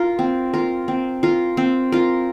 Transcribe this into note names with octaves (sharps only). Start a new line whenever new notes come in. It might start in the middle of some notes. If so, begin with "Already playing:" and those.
Already playing: F4 A#4
C4
F4 A#4
C4
F4 A#4
C4
F4 A#4